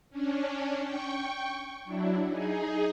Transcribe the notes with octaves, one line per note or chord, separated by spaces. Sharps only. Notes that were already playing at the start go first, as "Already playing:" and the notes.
C#4 D4
G5 C#6
F#3 D4 E4
D#4 G#4